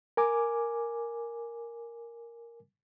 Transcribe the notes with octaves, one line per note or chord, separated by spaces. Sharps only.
A#4 G#5 D6